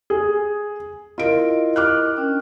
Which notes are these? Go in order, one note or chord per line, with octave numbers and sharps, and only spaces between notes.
G#4
E4 F4 A#4 D#5 D7
D6 F6 F#6
C#4 D4 G5